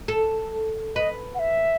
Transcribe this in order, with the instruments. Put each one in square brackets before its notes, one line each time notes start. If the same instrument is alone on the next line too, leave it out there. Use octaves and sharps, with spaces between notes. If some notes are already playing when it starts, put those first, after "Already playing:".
[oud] A4
[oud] B4 [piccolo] D#5
[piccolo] F#5
E5